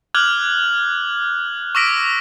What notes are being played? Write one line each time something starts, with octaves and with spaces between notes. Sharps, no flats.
D6 F6 F#6 G#6 F#7
C#6 D6 E6 A#6 B6 D7